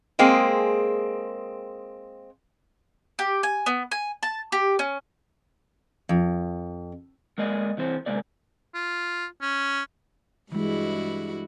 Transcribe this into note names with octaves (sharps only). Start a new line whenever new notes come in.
G#3 A#3 C4 G#4
G4
G#5
B3
G#5
A5
G4
C#4
F2
G#3 A#3 D5 D#5
C2 E3 C4 C5
C3 G#3 A#3 D5
F4
C#4
G2 E3 G#3 E4 F#4